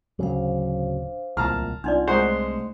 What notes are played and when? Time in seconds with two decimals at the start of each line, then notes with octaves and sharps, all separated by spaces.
0.19 D1 C#3 F#3 D4 C5 F5
1.37 D1 C2 A#2 A5 A#5 F6
1.84 C2 D4 D#4 F4 D5 F#5 C6
2.07 G#3 A3 C5 F#5 A#5 C#6